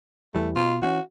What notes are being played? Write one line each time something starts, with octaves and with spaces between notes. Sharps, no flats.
E2 E3 G3 A3
B2 F4
E3 C4 C#4 F#4